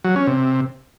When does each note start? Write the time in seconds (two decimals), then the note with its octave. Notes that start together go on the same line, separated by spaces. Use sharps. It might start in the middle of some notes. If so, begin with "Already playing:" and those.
0.04 F#3
0.16 C#4
0.27 C3